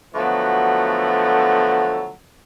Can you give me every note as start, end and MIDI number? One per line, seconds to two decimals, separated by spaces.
0.15 2.11 50
0.15 2.11 53
0.15 2.11 54
0.15 2.11 57
0.15 2.11 59
0.15 2.11 66